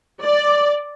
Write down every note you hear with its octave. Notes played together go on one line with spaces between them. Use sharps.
D5